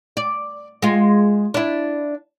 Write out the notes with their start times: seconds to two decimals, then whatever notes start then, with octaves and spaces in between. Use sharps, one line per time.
0.17 D5
0.82 G#3 F4
1.54 D4 E4